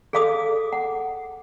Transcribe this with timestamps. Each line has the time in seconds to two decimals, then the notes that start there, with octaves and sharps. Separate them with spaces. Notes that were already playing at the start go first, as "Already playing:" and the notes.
0.13 G#4 A4 F5 D6 D#6
0.72 F#5